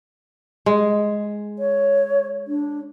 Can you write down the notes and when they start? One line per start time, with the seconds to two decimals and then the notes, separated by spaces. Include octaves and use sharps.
0.66 G#3
1.59 C#5
2.48 D4